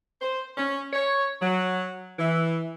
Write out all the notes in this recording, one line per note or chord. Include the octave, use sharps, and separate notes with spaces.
C5
C#4
C#5
F#3
E3